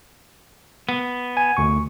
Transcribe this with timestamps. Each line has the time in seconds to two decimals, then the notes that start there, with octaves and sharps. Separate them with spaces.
0.89 B3
1.37 G#5
1.57 D2 C#6